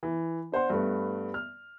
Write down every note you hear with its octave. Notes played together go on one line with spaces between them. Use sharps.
E3
D4 C5 F#5 C6
G2 A3 B3
F6